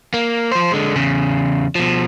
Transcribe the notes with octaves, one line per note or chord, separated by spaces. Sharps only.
A#3
F3 C5
D3 G#3
E2 C#3
B2 F3